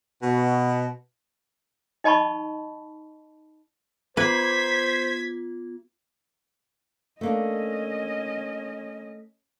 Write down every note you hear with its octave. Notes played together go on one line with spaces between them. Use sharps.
B2
D#4 D#5 A5 B5 C#6
B3 F4 B4 C5 G#6 B6
A3 A#3 C#4 D4 D#5